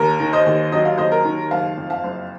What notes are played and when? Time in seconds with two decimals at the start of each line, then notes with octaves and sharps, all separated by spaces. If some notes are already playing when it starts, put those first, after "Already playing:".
Already playing: D#2 A#4
0.20 D#3
0.33 C5 D#5
0.46 D#2
0.72 F#3 D#5
0.85 F5
0.98 D#2 C5 D#5
1.12 A#4
1.25 D#3
1.51 F#1 F5 A5
1.78 F2
1.90 F5 A5
2.04 F#1